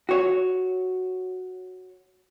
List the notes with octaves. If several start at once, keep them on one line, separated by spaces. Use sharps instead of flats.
F#4 C#5